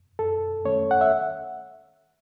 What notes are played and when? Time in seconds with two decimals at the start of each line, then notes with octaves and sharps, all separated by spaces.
0.19 F#2 A4
0.65 D#3 A3 C#4 C#5
0.91 F#5
1.01 E5